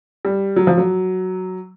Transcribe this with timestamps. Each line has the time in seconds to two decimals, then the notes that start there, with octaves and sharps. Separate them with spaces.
0.25 G3
0.56 F#3
0.67 F3
0.78 F#3